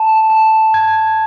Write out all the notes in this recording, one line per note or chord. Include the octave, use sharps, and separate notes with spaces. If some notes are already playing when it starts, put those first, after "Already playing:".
Already playing: A5
A5
G#6